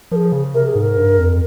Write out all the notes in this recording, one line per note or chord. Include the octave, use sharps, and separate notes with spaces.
F3 G#4 A#4
C#3
C3 A#4
G#4
G#2
A#4
G2
F2